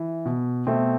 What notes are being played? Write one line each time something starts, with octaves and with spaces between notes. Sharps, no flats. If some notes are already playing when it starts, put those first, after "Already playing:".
Already playing: E3
B2
B2 A3 C4